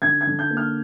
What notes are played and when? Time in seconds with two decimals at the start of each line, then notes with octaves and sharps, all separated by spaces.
0.02 D3 G#6
0.21 G#6
0.27 D3
0.39 G6
0.50 A#3
0.57 F6